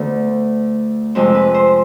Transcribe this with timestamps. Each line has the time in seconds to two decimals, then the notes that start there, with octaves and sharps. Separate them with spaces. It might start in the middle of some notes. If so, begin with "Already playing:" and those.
Already playing: D2 D3 A3 B3
1.15 F2 C3 G#3 C4
1.35 B4
1.54 C5